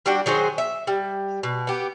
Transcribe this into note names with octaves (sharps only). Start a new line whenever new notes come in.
G3 D4 F#4 G5
D#3 F#3 G#4 C5
E5
G3
B2
B3 G4